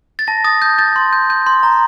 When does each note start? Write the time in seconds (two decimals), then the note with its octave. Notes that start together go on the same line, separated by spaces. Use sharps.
0.19 A6
0.28 A5 A#6
0.44 D#6 A6
0.62 G6
0.79 G6 A6
0.96 C6
1.13 G6
1.30 G6
1.46 C6
1.63 A#5